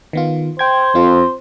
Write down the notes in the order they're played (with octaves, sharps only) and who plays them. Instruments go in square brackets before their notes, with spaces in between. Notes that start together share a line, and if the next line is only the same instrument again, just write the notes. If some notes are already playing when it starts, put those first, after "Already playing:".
[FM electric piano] D#3 B3 F4
[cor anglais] C5 [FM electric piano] G5 G#6
[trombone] F2 [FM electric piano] C4 F4